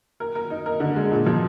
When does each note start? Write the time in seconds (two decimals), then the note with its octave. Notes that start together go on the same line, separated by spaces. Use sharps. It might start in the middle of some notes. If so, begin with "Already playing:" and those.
0.20 A#4
0.35 A#4
0.50 D#4
0.66 A#4
0.80 D3
0.96 G#3
1.12 A#2
1.26 F3